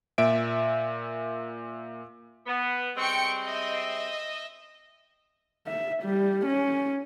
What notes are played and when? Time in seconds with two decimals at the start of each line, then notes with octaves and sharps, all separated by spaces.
0.18 A#2 E5 D7
2.47 B3
2.97 G3 G#3 C4 G5 C#6 C#7
3.44 D#5 E5
5.67 E5
6.03 G3
6.46 C#4